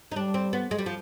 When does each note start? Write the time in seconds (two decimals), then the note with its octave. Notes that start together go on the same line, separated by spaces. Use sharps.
0.12 D#4
0.16 G3 D4
0.34 C4
0.53 B3
0.71 G#3
0.78 G3
0.86 F3